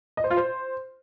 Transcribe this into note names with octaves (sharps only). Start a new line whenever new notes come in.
D#5
C5
F4
C5